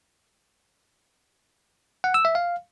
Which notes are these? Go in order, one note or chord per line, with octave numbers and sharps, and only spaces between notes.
F#5
E6
E5
F5